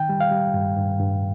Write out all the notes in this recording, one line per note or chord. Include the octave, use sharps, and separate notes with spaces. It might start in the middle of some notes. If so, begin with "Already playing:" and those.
Already playing: D#3 G5
G3
F5
G3
G2
G2
G2